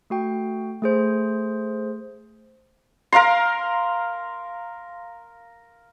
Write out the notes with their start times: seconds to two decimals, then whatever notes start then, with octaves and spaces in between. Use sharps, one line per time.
0.10 A3 F#4 G5
0.82 A3 G#4 C5
3.12 A#4 F5 A#5 C6